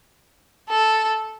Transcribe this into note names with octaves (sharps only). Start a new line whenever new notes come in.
A4